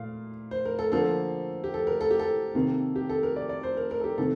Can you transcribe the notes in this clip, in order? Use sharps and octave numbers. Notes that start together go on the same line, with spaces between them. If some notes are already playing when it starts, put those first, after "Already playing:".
Already playing: A#2 A3 F5
C5
A#4
A4
D3 F3 A#3 A4
G4
A4
A#4
A4
G4
A4
C3 D#3 A#3
G4
A4
A#4
D5
D5
C5
A#4
A#4
A4
G4
C3 D#3 A#3 A4